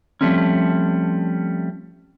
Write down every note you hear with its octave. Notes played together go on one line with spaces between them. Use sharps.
F3 G3 A3 C4 C#4